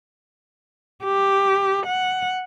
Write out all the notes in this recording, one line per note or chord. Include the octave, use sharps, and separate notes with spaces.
G4
F#5